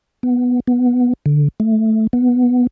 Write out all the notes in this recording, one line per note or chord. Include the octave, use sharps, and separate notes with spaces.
B3
B3
D3
A3
B3